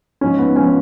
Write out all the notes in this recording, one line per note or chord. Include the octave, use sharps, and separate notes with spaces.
G#2 F3 C#4
B3
G#2 F3 C#4